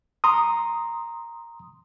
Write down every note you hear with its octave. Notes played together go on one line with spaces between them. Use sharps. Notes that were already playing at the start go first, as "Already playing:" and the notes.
A#5 C6 D#6